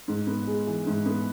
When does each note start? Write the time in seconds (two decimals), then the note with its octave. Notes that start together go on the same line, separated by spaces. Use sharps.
0.08 G#2
0.27 B3
0.47 G#3
0.67 E3
0.87 G#2
1.06 B3